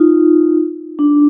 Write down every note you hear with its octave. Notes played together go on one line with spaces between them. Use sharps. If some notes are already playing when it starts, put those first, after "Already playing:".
Already playing: D#4 F4
D4